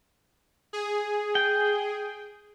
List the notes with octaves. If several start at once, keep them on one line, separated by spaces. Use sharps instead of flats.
G#4
G5